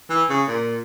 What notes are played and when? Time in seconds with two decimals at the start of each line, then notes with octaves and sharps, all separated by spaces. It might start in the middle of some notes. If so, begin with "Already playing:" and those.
0.10 E3
0.29 C#3
0.48 A#2